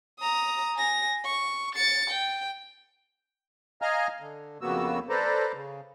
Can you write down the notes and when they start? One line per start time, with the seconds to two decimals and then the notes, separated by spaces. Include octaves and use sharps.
0.19 A#5 D#6
0.75 G#5 A#6
1.25 C#6
1.75 A6 C#7
2.10 G5
3.82 D#5 F5 G#5 A#5 F6
4.21 D3
4.61 F2 C#3 A#3 B3 F#4 E6
5.09 A4 B4 C5 D5 A#5
5.54 C#3